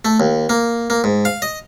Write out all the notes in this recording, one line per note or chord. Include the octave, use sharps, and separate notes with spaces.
A3
D#2
A#3
A#3
G#2
F5
D#5